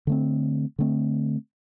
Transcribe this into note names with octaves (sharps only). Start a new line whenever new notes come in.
D3 A3 C4
D3 A3 C4